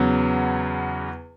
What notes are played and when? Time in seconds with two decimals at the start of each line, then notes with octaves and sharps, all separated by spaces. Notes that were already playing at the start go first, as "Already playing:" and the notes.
Already playing: E2 C#3 F#3 B3